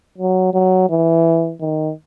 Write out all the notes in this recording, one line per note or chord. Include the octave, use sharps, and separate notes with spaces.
F#3
F#3
E3
D#3